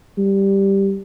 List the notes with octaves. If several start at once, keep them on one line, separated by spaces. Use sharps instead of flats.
G3